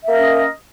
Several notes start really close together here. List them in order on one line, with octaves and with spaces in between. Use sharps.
E5 A#3 A#4 C#4 D#5